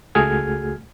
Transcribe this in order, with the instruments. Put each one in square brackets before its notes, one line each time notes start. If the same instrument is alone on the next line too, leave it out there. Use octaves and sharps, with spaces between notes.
[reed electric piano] C#2 A3 F#4 G#4 F6 G#6